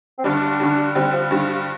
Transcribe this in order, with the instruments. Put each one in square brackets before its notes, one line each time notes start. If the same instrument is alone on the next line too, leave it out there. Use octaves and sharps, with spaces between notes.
[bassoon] C4
[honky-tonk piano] G2 D3 G3 [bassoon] D4
[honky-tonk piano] G2 D3 G3
[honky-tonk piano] G2 D3 G3 [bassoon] C4
[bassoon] F3
[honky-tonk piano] G2 D3 G3